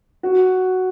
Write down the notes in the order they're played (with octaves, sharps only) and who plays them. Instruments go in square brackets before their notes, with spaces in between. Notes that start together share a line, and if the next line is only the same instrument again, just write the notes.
[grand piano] F#4